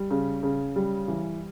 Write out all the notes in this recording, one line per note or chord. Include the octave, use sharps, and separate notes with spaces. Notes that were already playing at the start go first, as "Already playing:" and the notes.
Already playing: G3
C#3
C#3
G3
E3